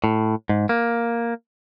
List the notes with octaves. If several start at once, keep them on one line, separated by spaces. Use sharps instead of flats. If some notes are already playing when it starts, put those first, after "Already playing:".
A2
G#2
A#3